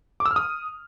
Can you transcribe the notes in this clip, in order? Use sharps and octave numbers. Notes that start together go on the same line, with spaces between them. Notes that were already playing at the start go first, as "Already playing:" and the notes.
D6
E6
F6
D#6